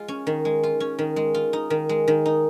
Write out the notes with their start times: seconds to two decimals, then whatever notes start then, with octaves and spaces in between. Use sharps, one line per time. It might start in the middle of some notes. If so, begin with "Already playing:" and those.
Already playing: G#3 F4
0.08 C#4
0.27 D#3
0.45 G#3
0.63 F4
0.80 C#4
0.99 D#3
1.16 G#3
1.34 F4
1.53 D#4
1.70 D#3
1.89 G#3
2.08 D#3
2.26 D#4